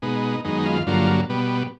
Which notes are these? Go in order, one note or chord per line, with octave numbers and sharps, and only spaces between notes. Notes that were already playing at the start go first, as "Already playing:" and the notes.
B2 G#3 B3 D#4
F#2 D#3 G#3 B3 D#4
F4
G2 D3 F#3 A#3 F4
B2 G3 B3